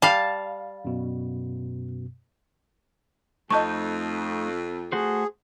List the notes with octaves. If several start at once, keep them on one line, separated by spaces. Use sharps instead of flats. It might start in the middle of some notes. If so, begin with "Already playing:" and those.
G3 F5 A5
F#2 B2
F2 A3 D#4 D#5 A5 C#6 G6
A3 F#4 G#4 C5